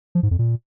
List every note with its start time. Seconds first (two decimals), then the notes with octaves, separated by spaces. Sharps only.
0.15 F3
0.23 G#2
0.31 F2
0.39 A#2